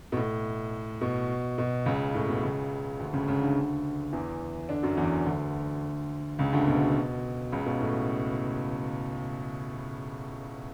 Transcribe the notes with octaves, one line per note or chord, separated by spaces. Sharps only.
B2
A2
B2
B2
C#2 C#3
A2
B2
C#2 C#3
D2 D3
C#2 C#3
C#2 C#3
D2 D3
E2 E3
D3 D4
F#2 F#3
E2 E3
D2 D3
C#2 C#3
D2 D3
B2
C#2 C#3
B2
A2